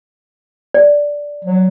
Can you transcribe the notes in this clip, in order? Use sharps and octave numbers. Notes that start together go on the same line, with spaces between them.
D5
F#3